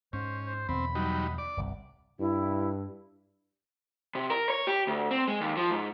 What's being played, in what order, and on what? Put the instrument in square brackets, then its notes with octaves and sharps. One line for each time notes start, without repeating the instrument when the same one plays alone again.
[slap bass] G#2 [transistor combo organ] C#4 [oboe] C5
[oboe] C5
[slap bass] E2 B2 D3 [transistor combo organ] C4 [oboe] B5
[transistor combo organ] F#3 G3 D#4
D5
[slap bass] G1 C2
[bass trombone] G2 [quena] E4
[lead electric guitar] C3
A#4
C#5
G4
D2
C4
G#3
D#2
F3
G#2